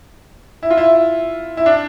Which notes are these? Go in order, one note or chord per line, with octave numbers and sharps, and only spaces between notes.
E4
F4
E4
E4
D4